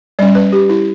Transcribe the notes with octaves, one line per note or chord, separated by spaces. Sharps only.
G3 C#4 D5
B4
G4
E4